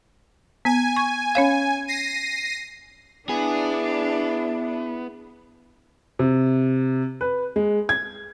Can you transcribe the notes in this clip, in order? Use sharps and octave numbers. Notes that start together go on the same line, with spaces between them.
B3 G#5
C#6
C#4 C#5 F5
A#6 C7 D#7
B3 D4 E4 G#4
C3
B4
G#3
G#6